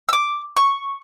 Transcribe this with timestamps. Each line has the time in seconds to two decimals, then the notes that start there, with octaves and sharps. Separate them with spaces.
0.09 D6 E6
0.57 C#6